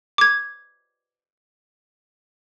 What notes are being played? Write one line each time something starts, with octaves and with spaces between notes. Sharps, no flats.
D6 G#6